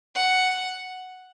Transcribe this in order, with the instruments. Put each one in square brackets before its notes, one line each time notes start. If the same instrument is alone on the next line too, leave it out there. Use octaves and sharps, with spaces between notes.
[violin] F#5